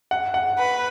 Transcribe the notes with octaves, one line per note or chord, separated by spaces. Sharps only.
F#5
F#5
B4